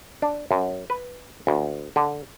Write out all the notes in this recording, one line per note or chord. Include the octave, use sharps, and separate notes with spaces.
D4
F#2
B4
D2
D3